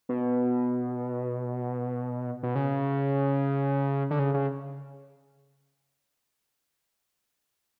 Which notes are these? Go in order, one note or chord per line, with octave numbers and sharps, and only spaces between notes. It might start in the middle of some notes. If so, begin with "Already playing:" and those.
B2
B2
C#3
D3
C#3
C#3